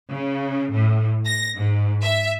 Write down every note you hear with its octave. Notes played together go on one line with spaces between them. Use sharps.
C#3
A2
A#6
G#2
E5